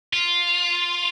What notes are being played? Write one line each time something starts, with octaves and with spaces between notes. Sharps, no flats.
F4